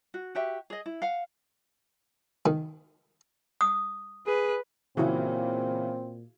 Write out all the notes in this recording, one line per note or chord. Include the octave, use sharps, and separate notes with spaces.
F#4
F#4 G4 E5
G#4 D#5
E4
F5 F#5
D#3
D#6
G#4 B4
A#2 C#3 E3 C4 E4 F#4 G#4